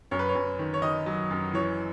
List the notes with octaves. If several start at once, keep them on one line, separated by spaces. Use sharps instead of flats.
F#2 C#5
B4
C#5
F#2
D#3
C#5
D#3 D#5
F#3
F#2
E3 C#5